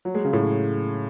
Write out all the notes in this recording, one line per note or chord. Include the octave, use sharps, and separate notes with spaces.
F#3
G#3
C#3
A2